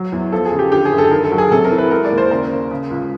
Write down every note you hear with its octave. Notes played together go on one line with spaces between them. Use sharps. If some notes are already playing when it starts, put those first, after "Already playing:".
Already playing: F#3
E2
F3 A4
G#4
C#3
G4
D3 G4
G#4
F#2
A4
D#3 A#4
A4
F#3
G#4
C3 A4
A#4
E3
B4
G#3 A#4
D5
D#2
C5
C#3 A#4
C#3
C#3
C#2